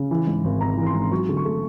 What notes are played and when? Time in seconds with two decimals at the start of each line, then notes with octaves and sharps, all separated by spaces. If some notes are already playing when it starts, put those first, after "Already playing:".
Already playing: C#3
0.11 E3
0.27 G#2
0.44 G#1
0.61 G#1 A#5
0.77 E3
0.86 C6
0.95 G#2
1.11 F#3 C#6
1.29 D3
1.37 C#6
1.45 A3